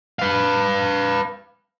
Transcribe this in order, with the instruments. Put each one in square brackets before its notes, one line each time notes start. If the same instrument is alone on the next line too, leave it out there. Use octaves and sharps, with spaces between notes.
[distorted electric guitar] B4 F5